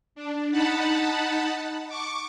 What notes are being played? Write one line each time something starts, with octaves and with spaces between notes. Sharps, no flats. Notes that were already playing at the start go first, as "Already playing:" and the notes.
D4
D#4 F#5 A5 B5
C#6 D6